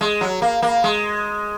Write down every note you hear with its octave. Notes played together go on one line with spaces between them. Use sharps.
G#3
F#3
A#3
A#3
G#3